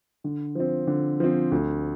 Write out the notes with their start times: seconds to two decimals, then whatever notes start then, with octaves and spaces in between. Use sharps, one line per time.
0.24 D3
0.55 F3 C4
0.87 D3
1.20 F3 C4
1.52 D2